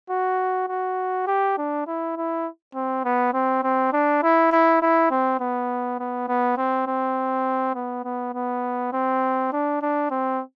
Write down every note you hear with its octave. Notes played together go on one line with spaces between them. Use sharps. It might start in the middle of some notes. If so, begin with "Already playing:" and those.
F#4
F#4
G4
D4
E4
E4
C4
B3
C4
C4
D4
E4
E4
E4
C4
B3
B3
B3
C4
C4
B3
B3
B3
C4
D4
D4
C4